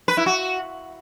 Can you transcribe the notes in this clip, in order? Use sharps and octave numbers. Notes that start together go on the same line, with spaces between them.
B4
E4
F#4